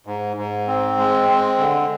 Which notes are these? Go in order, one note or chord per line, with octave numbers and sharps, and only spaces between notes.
G#2
G#2
C4
G#3
C4
D3